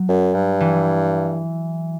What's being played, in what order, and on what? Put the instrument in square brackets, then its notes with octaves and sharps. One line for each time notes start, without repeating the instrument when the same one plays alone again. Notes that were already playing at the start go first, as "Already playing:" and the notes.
Already playing: [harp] F#3
[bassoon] F#2
G2
[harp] E3